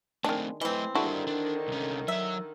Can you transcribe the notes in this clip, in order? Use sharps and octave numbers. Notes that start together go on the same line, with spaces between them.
D#3 G#3 A3 C4 D4
E3 A3 C4 D#5
D3 D#3 D4 E4 F#4 G4 A4
D4
C2 C#4
F#3 C#5 E5